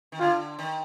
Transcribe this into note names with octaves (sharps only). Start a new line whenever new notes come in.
D#3
D3 F4
D#3